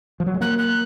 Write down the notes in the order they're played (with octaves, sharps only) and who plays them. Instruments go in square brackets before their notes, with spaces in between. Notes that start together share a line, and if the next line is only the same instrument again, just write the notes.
[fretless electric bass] F3
F#3
G#3
[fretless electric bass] A#3 [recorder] F#6
[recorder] F#6